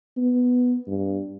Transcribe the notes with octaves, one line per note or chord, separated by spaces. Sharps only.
B3
G2